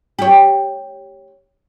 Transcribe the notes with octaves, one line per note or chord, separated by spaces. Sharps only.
G4 C#5